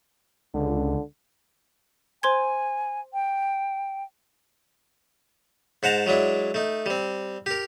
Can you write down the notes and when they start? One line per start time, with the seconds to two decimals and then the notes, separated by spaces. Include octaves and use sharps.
0.54 C#2 D3
2.23 C5 G#5 C6 G#6
3.14 G5
5.83 G#2 C5 F#5 A5 A#5
6.07 F#3 G#3 D4 E4
6.54 A3 D#4
6.86 G3 C4
7.46 G4 A#4